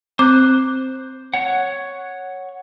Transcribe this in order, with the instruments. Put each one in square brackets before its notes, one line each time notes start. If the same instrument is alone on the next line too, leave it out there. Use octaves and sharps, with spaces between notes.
[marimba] C4 D6 [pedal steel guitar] C5 F#6
[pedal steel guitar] C#5 F#5